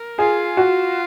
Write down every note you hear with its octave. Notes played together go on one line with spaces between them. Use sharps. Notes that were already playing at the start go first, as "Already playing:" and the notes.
Already playing: A#4
F4 G#4
F#4